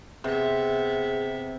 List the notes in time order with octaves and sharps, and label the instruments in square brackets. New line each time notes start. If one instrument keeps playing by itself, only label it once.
[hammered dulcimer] C3 [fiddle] B3 E5 [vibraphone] G#4